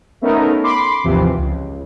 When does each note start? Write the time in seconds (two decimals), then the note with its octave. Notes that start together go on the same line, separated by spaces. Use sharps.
0.21 A3 B3 C#4 D#4 A#4
0.63 B5 C6 D6 C7
1.04 G#1 D#2 C3 E3 F3
1.38 C#2